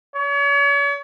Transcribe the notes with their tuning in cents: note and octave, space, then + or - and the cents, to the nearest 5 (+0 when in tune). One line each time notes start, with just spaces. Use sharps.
C#5 +40